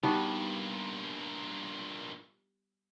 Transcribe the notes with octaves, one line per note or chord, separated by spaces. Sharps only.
G2 A#2 G3 B3 D#4 F#4